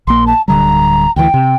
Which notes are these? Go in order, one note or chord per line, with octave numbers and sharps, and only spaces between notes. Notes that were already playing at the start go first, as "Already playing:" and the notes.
A#1 A#3 C6
A5
D1 D3 G3 A#5
D2 E3 G5
C3